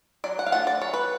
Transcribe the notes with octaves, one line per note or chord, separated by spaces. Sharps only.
F#3 D5
F#5
F5
A3 D4 F4 F#5
D5
F#3 C#5
B4